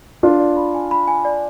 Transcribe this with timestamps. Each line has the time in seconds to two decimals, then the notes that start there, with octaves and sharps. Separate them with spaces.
0.23 D4 F4 A#4
0.40 D5
0.57 B5
0.75 G#5
0.91 B5
1.08 G#5
1.25 D5